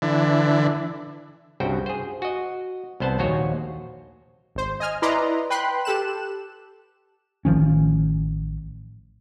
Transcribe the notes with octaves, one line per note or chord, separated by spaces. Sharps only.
D3 E3
C2 G2 C#3 F#4 C5 G5
G#4 C5
F#4 D#5
C2 B3 C5 F#5 A5
A#1 D#2 F#4 C5 C#5 D#5
G#1 C5
D#5 G#5 F6
E4 B4 D5 D#5 A#5 C6
B4 G5 B5 C6 F#6
G4 A4 F#6 E7
A1 D#3 F3 C#4